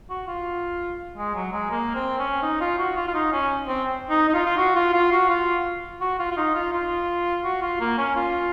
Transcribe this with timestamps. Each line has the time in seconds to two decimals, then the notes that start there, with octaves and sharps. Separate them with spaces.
0.10 F#4
0.27 F4
1.18 G#3
1.35 F#3
1.53 G#3
1.71 A#3
1.95 C4
2.19 C#4
2.42 D#4
2.61 F4
2.78 F#4
2.97 F4
3.08 F4
3.14 D#4
3.32 C#4
3.68 C4
4.10 D#4
4.29 D#4
4.34 F4
4.46 F4
4.57 F#4
4.76 F4
4.94 F4
5.12 F#4
5.29 F4
6.01 F#4
6.19 F4
6.31 F4
6.37 D#4
6.55 F4
6.73 F4
7.44 F#4
7.62 F4
7.80 A#3
7.98 C#4
8.16 F4